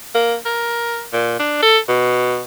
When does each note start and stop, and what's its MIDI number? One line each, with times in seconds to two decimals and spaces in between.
0.15 0.36 58
0.46 1.03 70
1.13 1.39 46
1.39 1.59 62
1.62 1.78 69
1.89 2.43 47